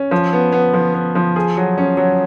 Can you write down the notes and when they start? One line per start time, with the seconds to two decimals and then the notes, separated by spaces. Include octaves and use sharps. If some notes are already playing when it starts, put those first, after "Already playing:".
Already playing: C#4
0.11 F3
0.33 B3
0.52 B3
0.74 F3
0.94 B3
1.15 F3
1.36 G#4
1.57 F#3
1.78 C#4
1.97 F#3